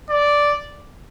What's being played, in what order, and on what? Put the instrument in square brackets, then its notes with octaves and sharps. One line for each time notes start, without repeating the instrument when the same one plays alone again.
[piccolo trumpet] D5